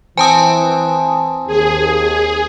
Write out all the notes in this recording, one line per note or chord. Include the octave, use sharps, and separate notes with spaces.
E3 C4 G#5 A5 D#6
D#2 G#4